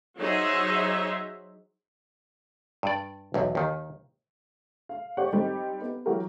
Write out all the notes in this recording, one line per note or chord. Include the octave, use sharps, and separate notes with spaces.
F#3 D#4 G#4 C5 E5
G2 D5
B1 E2
D#2 D#3
F5
G4 C5 D5 F#5 C#6
G3 C4 D#4 G4
B3
E3 F#3 F#4 G4 A#4